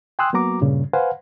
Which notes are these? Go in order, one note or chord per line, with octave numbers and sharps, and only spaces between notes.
G5 G#5 C6 D#6 E6 F#6
F#3 A#3 B3 F#4 A#5 D6
G2 A#2 C#3
B4 C5 F5 F#5 G#5